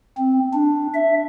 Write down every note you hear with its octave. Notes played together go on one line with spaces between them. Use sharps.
C4
D4
E5